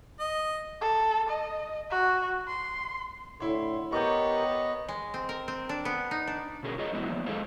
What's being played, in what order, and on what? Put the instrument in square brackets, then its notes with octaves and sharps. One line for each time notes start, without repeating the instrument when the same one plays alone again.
[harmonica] D#5
[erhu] A4
D#5
F#4
C6
[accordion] A2 D3 C6 [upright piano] E4 C#5
[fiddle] B3 C#5 [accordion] G4 A#4 [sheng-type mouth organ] D#5 [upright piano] C#6 G6
[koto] G#3
C4
A#4
C4
D4
B3
D#4
D4
[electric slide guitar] B2 D3 C#4 G#4 A#4
F4 G#4 A#4 C#5 D#5
D3 F3 F#3 G#3 B3 E4
D#3 F3 A#3 B3
G#3 G#4 A4 C5 D#5 F5